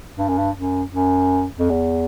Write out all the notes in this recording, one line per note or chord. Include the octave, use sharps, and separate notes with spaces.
G2
F#2
G2
F#2
F#2
F2
E2